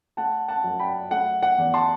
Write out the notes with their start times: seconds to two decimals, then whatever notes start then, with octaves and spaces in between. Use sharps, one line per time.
0.17 A3 F#5 A5
0.48 F#5 A5
0.64 F#2
0.79 G5 B5
1.11 A3 F#5
1.43 F#5
1.58 E2
1.74 A5 C6